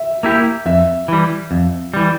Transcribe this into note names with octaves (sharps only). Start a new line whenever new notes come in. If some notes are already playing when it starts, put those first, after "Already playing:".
Already playing: E5
A#3 E4 G4
F2 E5
E3 G3
F2
E3 G3